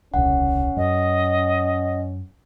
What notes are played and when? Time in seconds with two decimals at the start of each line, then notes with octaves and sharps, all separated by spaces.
0.14 D#1 C2 C#3 C#4 F#5
0.77 F#2 D#5